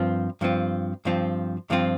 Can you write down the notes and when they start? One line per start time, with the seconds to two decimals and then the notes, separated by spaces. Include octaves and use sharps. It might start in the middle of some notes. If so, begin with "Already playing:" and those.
Already playing: G2 F3 C4 F4
0.41 G2 F3 C4 F4
1.05 G2 F3 C4 F4
1.70 G2 F3 C4 F4